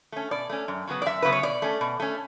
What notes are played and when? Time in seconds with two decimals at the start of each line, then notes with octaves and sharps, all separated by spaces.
0.12 A3 C#4
0.31 B2 D5
0.49 A3 C#4
0.68 F#2
0.87 C#3 F#3 B3
1.02 D5
1.06 F#2 E5
1.22 C#3 F#3 B3 B4
1.32 C#5
1.43 B2 D5
1.62 A3 C#4
1.81 B2
2.00 A3 C#4